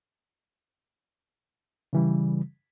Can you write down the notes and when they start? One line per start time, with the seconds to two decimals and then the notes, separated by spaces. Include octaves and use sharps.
1.93 C#3 E3 G3